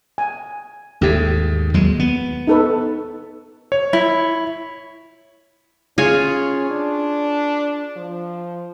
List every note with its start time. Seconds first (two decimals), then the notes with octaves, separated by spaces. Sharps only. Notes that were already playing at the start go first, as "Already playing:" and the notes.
0.18 G#5
1.01 D#2 G#2 A3 G4
1.74 D#2 F#3 G#3
2.00 B3
2.47 D#4 A4 B4
3.72 C#5
3.93 E4
5.98 C#4 F4 G#4 C#5
6.71 D4
7.97 F3